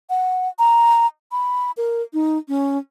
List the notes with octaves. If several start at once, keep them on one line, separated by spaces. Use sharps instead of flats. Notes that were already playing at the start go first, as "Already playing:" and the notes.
F#5
A#5
B5
A#4
D#4
C#4